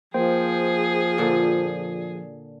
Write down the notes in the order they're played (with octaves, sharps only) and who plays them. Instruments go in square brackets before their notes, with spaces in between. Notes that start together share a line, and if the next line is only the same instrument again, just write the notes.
[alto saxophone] F3 [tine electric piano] A#3 C5 G5 [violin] G#4
[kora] A#2 D3